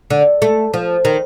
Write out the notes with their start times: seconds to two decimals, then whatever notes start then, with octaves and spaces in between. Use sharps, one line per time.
0.10 D3
0.42 A3
0.74 F3
1.05 D#3